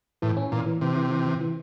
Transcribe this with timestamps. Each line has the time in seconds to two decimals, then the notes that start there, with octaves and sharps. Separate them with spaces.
0.22 A2 E3
0.37 C#4
0.52 A#2 E3
0.66 E3
0.81 C3 E3
0.96 E3
1.10 E3
1.26 E3
1.40 E3